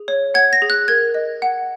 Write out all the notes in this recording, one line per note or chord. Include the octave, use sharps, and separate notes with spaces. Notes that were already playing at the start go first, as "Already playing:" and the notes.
Already playing: G#4
C#5
F#5 G#6
A#6
G#4
F#6
A#4 G#6
D#5
F#5